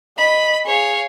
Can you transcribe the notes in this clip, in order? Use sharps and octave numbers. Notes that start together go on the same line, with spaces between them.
D#5 B5
G#4 C#5 F5